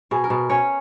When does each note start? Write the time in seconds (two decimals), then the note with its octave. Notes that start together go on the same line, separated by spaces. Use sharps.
0.11 B2 G#4
0.24 A#4
0.30 B2
0.49 C#4 C#5